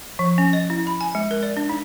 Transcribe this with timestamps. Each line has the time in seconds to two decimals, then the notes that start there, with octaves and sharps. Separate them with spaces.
0.19 F3
0.38 C#4
0.53 D#5
0.70 E4
0.87 B5
1.01 G#5
1.15 G#3
1.31 A#4
1.43 D5
1.57 D4
1.69 D#4